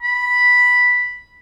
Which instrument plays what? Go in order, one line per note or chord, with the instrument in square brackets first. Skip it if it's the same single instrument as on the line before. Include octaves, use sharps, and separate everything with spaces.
[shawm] B5